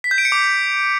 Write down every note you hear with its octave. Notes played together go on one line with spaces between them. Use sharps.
B6
G6
D7
C#7
D6